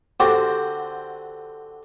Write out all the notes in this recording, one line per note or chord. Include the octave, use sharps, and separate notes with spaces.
D3 C4 D4 F#4 G4 C5